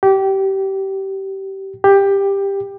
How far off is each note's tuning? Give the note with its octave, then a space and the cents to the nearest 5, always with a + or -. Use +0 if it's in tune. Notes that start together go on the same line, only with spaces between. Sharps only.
G4 -20
G4 +15